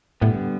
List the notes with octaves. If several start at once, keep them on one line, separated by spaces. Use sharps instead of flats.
A2 D3 G3 B3